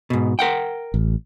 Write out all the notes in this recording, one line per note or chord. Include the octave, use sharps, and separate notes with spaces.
G#2 B2
A#4 F#5 G5
A1